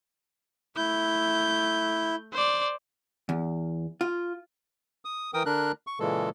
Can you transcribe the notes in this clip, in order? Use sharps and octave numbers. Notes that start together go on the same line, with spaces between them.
A3 E4 G6
C5 D5
E2
F4
D#6
E3 A#4 G5 D#6
D3 D4 A#4 F#6
C#6
A#2 C#3 E3 G#3 A4